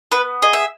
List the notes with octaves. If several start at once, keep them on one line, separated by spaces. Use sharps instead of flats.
B3 B4
G#4 D#5
E5